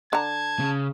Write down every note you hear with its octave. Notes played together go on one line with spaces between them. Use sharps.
D3 A5 A#5 G#6
C#3